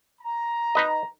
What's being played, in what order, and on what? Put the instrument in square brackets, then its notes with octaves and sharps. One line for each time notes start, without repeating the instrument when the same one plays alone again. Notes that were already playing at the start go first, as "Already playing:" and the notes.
[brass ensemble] A#5
[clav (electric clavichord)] D#4 B4 D#5